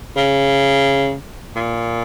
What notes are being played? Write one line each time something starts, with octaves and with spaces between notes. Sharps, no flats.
C#3
A#2